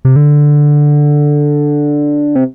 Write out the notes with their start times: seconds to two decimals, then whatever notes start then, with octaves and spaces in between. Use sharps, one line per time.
0.05 C3
0.16 D3
2.35 C3